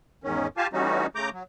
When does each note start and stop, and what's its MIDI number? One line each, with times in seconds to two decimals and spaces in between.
0.24 0.47 40
0.24 0.47 44
0.24 0.47 51
0.24 0.47 61
0.57 0.67 65
0.57 0.67 67
0.57 0.67 77
0.57 0.67 80
0.57 0.67 81
0.73 1.06 52
0.73 1.06 55
0.73 1.06 57
0.73 1.06 61
0.73 1.06 63
0.73 1.06 66
1.15 1.30 49
1.15 1.30 57
1.15 1.30 82
1.15 1.30 86
1.15 1.30 91
1.33 1.43 54